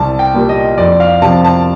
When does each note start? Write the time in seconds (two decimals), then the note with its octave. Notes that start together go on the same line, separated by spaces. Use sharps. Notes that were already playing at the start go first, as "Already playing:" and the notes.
Already playing: C2 A5
0.19 G5
0.34 A#2 G3 A#3
0.49 D#5
0.78 F2 D5
1.00 F5
1.22 C3 F3 A5
1.45 A5